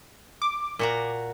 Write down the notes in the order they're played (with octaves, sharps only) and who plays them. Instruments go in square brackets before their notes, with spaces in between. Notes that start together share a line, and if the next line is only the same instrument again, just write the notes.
[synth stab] D6
[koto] A#2 F#4 A#5